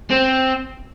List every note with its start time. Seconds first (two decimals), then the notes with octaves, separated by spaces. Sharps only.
0.11 C4